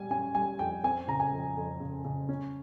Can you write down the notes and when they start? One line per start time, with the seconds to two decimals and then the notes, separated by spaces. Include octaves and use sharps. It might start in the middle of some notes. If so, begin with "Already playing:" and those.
Already playing: G3 G#5
0.11 C#4 G#5
0.35 G3 G#5
0.59 F2 G5
0.83 C4 G#5
1.08 C#3 A#5
1.20 G#5
1.32 F2
1.56 F2
1.80 C#3
2.05 C#3
2.29 C#4